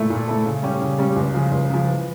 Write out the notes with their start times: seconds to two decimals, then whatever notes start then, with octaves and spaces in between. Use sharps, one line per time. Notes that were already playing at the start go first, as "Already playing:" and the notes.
Already playing: A#2 A3 E4 A4
0.10 A#2
0.28 A3 E4 A4
0.45 C#3
0.63 G3 C#4 G4
0.81 C#3
0.99 G3 C#4 G4
1.16 C#2
1.34 C#3 F3
1.51 C#2
1.70 C#3 F3
1.87 E3